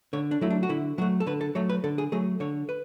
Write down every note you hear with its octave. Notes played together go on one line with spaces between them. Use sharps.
D3 C#5
D4
F#3 A3 E4
D4
F#4
D3 E4
F#3 A3 F#4
A4
D3 B4
A4
F#3 A3 C#5
B4
D3 A4
G#4
F#3 A3 G#4
D3 C#5
B4